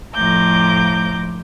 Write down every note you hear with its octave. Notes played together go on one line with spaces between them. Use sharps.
F2 A2 F3 A#5 D6 G6